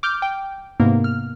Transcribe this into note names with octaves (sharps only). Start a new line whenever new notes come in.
D6 F6 G6
G5
G#2 C3 A#3 B3
F6